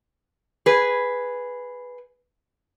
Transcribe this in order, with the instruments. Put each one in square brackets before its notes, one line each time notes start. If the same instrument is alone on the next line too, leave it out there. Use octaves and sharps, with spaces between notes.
[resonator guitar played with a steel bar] G#4 B4